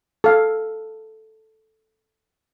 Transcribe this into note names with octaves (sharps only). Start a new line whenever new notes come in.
A4 F5